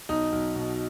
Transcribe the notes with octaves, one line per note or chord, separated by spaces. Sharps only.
B1 D#4
B1
B2